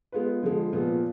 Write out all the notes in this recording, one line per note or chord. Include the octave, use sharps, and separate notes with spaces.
G#3 B3 F4 B4
D3 F3 G#3
A#2 F3 B3